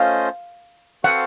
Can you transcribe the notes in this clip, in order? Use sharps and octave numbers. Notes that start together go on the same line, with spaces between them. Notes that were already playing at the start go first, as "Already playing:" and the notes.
Already playing: A3 C#4 F4 C5 D#5 F5
C4 F#4 A4 C5 F5 F#5